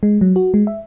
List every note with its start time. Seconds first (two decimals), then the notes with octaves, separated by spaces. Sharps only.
0.03 G#3
0.21 F#3
0.36 F#4
0.54 G#3
0.67 E5